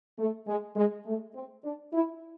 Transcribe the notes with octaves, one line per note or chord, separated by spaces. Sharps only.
A3
G#3
G#3
A3
C4
D4
E4